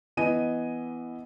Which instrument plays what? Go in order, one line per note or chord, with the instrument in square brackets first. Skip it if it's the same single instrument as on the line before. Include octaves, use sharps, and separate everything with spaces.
[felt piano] E3 B3 D#5 G#5 D#7